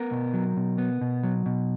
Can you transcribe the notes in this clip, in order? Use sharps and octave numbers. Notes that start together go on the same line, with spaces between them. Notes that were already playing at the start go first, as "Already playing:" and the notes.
Already playing: B3 A#4
B2
F#3
B2
B3
B2
F#3
B2